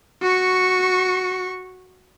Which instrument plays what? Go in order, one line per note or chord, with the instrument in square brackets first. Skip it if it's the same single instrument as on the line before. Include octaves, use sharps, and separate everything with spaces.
[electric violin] F#4 C#6